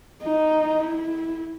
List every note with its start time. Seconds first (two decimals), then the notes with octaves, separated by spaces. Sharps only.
0.23 D#4
0.80 E4